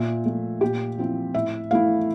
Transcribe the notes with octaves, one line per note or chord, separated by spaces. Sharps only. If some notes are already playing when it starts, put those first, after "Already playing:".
Already playing: A#2 E5
F3 A3
A#2 G4
F3 C4 E4
A2 E5
E3 A3 E4 F5